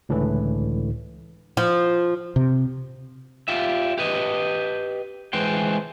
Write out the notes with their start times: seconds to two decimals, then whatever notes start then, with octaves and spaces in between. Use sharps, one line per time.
0.09 C#2 A2 D3 E3
1.57 F3
2.36 C3
3.48 F4 G4 E5
3.98 G4 B4 D#5
5.33 E3 G#3 B4 C5 G5